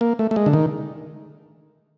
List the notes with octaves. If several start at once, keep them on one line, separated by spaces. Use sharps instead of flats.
A#3
A3
A3
G#3
D3
D#3